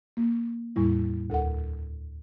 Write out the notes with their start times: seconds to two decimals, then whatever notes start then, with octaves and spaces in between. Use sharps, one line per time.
0.17 A#3
0.76 E2 A2 G3 E4
1.30 D2 A4 A#4 F#5